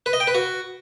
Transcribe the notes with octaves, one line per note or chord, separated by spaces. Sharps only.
B4
D#5
G5
B4
F#4